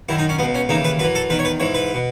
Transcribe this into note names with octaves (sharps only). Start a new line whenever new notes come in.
F#2 D#3 E4
D#4
C#4
C#2 B2 B3
C#4
D#2 C#3 E3 D#4
B4
F#2 E3 B4
A4
E2 D#3 B4
C#5
B4
G#2 E3 C#5
B4
B2